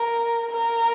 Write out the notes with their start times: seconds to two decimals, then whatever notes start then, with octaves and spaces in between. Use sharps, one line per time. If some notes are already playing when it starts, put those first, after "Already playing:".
Already playing: A#4
0.52 A#4